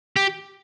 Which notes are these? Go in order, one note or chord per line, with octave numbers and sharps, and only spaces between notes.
G4